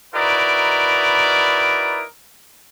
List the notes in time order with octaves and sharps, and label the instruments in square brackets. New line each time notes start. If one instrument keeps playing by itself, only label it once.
[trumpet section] D#4 E4 F#4 A#4 B4 D5